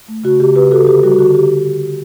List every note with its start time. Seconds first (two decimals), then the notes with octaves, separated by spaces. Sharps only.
0.08 A3
0.24 C#3 F#4
0.40 C#3 G4
0.55 C#3 G4 B4
0.71 C#3 F#4 A4
0.87 D3 G4
1.03 G3 F#4
1.19 D3 F#4
1.34 D3 G4